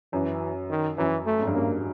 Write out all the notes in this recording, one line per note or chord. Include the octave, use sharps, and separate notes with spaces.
F#2 E3
D#3
F#2 E3
A3
G#2
G2
F#2 A#3